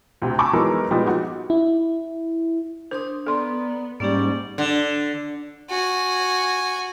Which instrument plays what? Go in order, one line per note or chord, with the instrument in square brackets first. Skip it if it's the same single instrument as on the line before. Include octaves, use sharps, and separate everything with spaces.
[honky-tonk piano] D2 C3
G#5 A5 B5 C#6 D6 E6
E3 F#3 G#3 B3 D#4 A#4
A#2 F3 G3 G#3 B3 D#4
D#4 F#4
[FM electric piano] E4
[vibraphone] D4 C6 D#6 [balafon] A#4 C5
[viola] B3 [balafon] A4 C6 [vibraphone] D5 A#5
[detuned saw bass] G#2 [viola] G3 D5 [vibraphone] A#3 C#4 G4
[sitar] D3
[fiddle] F#4 G#5